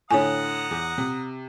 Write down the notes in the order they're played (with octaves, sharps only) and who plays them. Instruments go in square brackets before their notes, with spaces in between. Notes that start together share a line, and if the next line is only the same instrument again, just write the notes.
[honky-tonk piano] A2 D3 [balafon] C#5 G#5 [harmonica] F#5 A#5 D#6
[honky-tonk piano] E2
C3